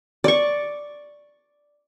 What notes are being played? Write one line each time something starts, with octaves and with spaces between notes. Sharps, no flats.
D5 C#6